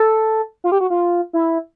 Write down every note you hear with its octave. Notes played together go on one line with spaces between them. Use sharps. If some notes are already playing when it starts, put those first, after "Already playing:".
Already playing: A4
F4
G4
F#4
F4
E4